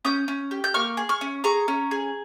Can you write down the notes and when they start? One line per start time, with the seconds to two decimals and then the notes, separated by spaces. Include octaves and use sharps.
0.05 C#4 D#6 G6
0.28 C#4
0.51 G4
0.64 G6
0.74 A#3 C#6 F6
0.97 G#4
1.09 C#6 F6
1.21 C#4
1.44 G#4 A#5 C#6
1.68 C#4
1.91 G#4